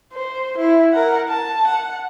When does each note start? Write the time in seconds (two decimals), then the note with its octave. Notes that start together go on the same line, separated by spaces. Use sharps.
0.13 C5
0.58 E4
0.93 A#4 F#5
1.29 A5
1.67 F#5